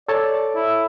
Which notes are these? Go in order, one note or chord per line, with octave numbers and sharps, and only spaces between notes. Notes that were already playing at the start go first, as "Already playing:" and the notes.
A4 C#5 D5 A5
E4